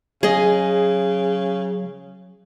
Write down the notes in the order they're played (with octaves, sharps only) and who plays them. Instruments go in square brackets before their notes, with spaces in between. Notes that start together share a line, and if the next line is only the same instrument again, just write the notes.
[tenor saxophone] C#3 [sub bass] F#3 [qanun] G#4 D#5